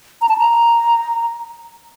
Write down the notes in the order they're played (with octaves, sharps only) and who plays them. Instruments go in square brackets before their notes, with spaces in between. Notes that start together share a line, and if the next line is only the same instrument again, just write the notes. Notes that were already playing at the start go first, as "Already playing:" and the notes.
[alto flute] A#5
A5
A#5